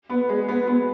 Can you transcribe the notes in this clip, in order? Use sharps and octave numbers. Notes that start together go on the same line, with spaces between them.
B3
G#3
B3
B3